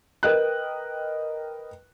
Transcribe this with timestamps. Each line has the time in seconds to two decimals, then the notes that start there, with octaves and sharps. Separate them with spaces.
0.23 A#4 B4 D#5 G5 F#6